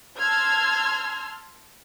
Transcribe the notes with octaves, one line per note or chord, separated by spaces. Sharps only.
A5 C6 E6 F6 G#6